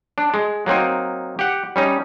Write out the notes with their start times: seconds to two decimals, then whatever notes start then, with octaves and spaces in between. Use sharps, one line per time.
0.18 D4
0.34 G#3
0.66 F#3 A#3 C4 D#4
1.39 G4 F#5
1.76 G3 C#4 D#4